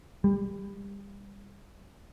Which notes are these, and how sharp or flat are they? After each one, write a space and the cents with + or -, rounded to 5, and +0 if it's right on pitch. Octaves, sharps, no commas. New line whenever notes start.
G3 +30